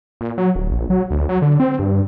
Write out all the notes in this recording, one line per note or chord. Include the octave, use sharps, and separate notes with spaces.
A#2
F#3
D1
A#1
F#3
D2
F#3
D3
C4
G2